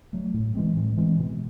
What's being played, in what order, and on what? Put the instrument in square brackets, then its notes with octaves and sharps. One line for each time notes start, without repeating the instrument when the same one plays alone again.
[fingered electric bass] F#3 A3
A2
E3 G#3 C4
A2
E3 G#3 C4
B2